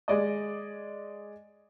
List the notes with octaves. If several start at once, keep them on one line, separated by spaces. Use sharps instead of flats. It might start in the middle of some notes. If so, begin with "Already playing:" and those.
G#3 D5 D#5